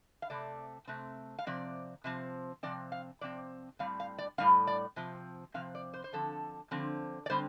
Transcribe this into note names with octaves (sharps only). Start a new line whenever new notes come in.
F5
C3 A3 C4 D5
C3 A3 C4
F5
C3 F3 C4 D5
C3 F3 C4
C3 F3 C4 D5
F5
C3 F3 C4 D5
A2 G3 C4 F5
F5
D5
A2 G3 C4 F5
D5
C3 F3 C4
C3 F3 C4 F5
D5
C5
C5
D3 F3 C4 A4
D3 F3 C4
D5
D3 G3 C4 C5